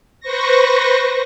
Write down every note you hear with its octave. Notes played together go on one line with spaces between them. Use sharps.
B4 C5 C#6 A#6